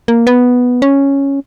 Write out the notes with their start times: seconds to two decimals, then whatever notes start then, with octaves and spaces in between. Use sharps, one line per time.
0.08 A#3
0.27 B3
0.82 C#4